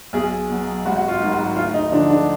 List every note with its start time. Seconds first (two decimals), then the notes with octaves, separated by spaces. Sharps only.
0.13 B1 G#4
0.50 B2 F#3
0.85 G#1 F#4
0.96 F#4
1.08 F4
1.20 G#2 D#3 F#3
1.33 F#4
1.56 D2 F4
1.74 D#4
1.92 D3 F3 D4
2.10 D4